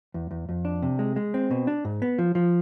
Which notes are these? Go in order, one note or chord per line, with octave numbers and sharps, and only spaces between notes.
E2
E2
F2
D4
C3
G#3
G#3
C4
B2
D4
G#2
B3
F3
F3